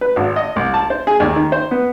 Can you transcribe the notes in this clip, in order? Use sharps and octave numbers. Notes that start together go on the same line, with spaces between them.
B4
G#1
D#5
C2
A5
C5
G#4
D#2
D#3
C5
B3